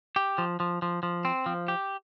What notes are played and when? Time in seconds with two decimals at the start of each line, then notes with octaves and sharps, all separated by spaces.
0.16 G4
0.38 F3
0.60 F3
0.82 F3
1.03 F3
1.25 C4
1.46 F3
1.68 G4